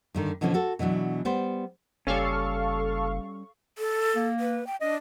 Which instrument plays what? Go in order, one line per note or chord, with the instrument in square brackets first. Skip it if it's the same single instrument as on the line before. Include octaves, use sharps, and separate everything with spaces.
[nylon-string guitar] G2 D3 D#3
B2 D3 E3 F3 C#4
F#4 A4
B2 E3 F#3 D4
G3 B3 C5
[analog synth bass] F#1 [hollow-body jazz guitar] G3 C#4 [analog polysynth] A4 F5 C#6
[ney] A4
[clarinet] A#3
[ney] B4
G5
[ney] D4 [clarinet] D#5